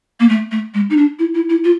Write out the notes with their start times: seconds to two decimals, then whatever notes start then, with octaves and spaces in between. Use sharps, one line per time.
0.20 A#3
0.28 A3
0.51 A3
0.74 G#3
0.90 D#4
0.97 D4
1.19 E4
1.34 E4
1.49 E4
1.64 F4